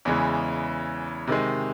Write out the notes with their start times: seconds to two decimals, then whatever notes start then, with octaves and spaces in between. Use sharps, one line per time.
0.05 E2 C#3 E3 G#3
1.27 C3 D#3 G#3